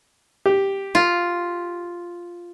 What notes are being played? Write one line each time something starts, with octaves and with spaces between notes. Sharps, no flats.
G4
F4